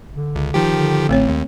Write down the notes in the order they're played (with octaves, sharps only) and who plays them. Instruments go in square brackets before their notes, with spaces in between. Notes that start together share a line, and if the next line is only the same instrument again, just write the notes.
[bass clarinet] D3
[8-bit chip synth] C#2
D#3 F3 G4
[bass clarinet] D3
[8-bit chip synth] A1 [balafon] A3 C4 C#5
[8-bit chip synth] D#2